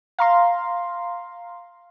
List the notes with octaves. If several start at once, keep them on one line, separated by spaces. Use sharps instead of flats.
F5 A#5 C6